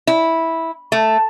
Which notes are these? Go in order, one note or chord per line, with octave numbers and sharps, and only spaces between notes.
E4
A3